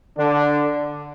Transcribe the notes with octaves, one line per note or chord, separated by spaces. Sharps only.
D3 D4